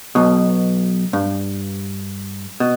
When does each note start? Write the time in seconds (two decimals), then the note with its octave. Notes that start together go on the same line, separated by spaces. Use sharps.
0.15 B1 B2
1.13 G2
2.60 B2